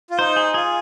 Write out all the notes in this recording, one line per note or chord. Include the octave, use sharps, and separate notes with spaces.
F4
D#4 C5
G#4
F4 G#4